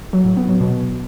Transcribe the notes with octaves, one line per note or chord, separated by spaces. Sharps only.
F#3
A2
B3
F#3
B2